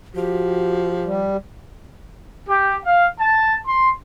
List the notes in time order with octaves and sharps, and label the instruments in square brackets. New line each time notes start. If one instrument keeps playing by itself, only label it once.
[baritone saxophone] F3 [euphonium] F#4 [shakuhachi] G4
[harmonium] G3
[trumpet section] G4
F5
A5
C6